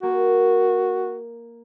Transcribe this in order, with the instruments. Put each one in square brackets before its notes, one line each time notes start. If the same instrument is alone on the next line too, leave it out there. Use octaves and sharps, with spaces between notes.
[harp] A#3 [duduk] F#4